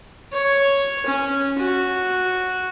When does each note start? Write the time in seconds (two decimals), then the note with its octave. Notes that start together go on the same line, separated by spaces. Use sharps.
0.33 C#5
1.06 C#4
1.59 F#4